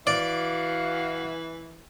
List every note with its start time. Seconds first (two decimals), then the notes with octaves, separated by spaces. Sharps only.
0.07 E3 F#4 D5 F5